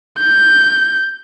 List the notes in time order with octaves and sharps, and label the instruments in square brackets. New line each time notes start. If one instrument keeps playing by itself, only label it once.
[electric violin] G6